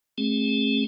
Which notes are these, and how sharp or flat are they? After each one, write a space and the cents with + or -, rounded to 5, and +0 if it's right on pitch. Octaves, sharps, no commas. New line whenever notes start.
A3 -20 C4 +45 G#4 -15